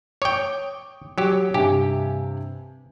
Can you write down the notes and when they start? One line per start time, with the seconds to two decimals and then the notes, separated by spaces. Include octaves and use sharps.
0.22 C#5 G5 D6 D#6
1.18 F#3 G4
1.54 G2 C3 G4 G#5